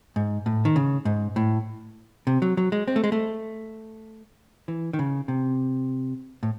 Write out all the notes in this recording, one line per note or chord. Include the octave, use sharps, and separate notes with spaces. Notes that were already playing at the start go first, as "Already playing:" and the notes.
G#2
A2
D#3
C#3
G#2
A2
C3
F#3
F#3
G#3
C4
A3
G#3
A3
E3
D#3
C#3
C3
A2